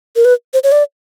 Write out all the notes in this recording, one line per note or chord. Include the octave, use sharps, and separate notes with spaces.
A#4
B4
C5
C#5
D5